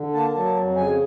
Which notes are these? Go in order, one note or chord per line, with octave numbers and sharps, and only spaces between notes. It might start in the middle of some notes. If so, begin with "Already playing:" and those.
Already playing: D3
A#3 A5
F#3
F2
C#3 G#5